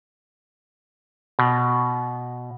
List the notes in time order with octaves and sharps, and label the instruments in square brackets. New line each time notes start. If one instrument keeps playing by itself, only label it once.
[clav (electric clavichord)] B2